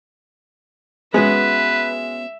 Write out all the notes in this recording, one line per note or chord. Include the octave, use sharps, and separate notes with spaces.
G#3 B3 C#4 F#4 B4 E5